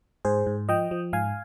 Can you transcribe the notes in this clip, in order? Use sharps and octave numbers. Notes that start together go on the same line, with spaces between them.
G#2 G#4 C5
G#2
F3 D#5 G5
F3
G#2 F5 G#5